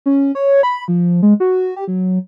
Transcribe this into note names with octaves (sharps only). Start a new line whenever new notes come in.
C#4
C#5
B5
F3
G#3
F#4
G4
F#3